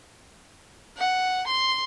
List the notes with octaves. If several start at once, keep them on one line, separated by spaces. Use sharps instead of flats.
F#5
C6